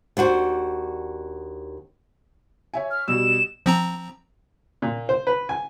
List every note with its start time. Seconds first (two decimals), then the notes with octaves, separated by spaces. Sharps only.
0.17 D#2 D4 F#4 C5
2.74 C#5 E5 G#5
2.90 F6
3.08 B2 G3 E6 E7
3.66 F3 C4 A#5
4.82 A#2
5.09 C5
5.27 B4
5.49 G#5